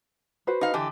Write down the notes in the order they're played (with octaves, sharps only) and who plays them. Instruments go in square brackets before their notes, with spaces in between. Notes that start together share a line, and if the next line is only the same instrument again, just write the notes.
[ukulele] F#4 B4 C5
[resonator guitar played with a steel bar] D#4 F5
D3 E3 G4